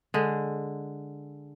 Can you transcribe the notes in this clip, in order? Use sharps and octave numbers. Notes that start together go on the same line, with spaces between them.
D3 G#3